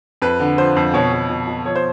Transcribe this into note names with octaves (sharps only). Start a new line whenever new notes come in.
F2 B4
D3
F3 C5
F2
B2 C#5
B2
B2
B2
F3 C#5
C5